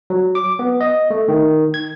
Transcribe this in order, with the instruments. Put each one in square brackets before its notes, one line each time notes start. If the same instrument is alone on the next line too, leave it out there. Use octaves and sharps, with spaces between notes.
[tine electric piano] F#3
D6
B3
D#5
A3
D#3
G#6